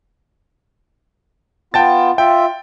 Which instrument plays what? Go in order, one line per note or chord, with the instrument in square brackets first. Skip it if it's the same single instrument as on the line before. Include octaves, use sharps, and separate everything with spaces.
[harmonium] B3 F4 [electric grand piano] G5 A5 A6
[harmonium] F4 E5 [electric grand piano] G5